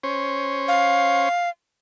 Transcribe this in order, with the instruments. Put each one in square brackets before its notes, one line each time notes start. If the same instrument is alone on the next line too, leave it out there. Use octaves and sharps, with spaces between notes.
[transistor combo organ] C#4 C5 C#5
[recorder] F5